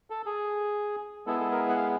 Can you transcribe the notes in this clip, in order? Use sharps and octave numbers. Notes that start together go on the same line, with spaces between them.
A4
G#4
G#3 B3 E4 G#4 A4
A4
A#4
F#5
F5